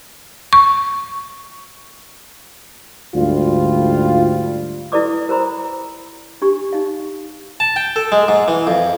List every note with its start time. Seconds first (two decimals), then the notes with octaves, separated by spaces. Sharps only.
0.53 C#6
3.15 D2 G#2 G3 F4
4.92 E4 A4 B4 D5 D6 D#6
5.29 A#4 C5 A#5 B5
6.42 D4 G4 C#6
6.73 D#4 F5
7.60 A5
7.76 G5
7.96 A4
8.12 G#3
8.28 G#2
8.48 E3
8.67 F2